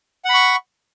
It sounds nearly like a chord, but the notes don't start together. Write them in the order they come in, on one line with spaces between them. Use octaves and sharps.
F#5 B5 C#6